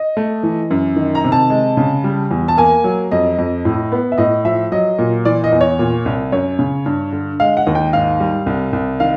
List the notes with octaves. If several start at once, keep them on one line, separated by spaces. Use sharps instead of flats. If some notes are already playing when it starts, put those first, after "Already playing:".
Already playing: D#5
A3
E3
F#2
D#3
A#5
C3
A5
G#3
C#3
G3
E2
A5
A#3 G#5
F#3
F2 D#5
F2
A2
B3
E5
A2 D#5
F3 E5
F#3 D#5
A#2
E3 D5
D#5
E2
C#5
A#2
C2
F#2 C#5
C#3
G2
D3
G#3 F5
F#5
D#2
G5
G#2 F5
G3
C2
C2
D#3 F5